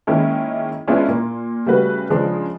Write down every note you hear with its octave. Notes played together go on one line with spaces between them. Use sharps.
D#3 G#3 A#3 C#4 E4
G#3 B3 C#4 D4 E4 F4
A#2 A#3
C#3 G3 A3 F#4 B4
C#3 F3 G#3 D4